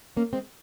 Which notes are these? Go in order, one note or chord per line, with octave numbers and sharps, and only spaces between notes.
A#3 C#4
G#3 C4